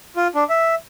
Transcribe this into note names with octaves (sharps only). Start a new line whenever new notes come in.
F4
D4
E5